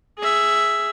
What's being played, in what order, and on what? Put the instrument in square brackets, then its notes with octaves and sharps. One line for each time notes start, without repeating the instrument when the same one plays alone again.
[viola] G#4 E5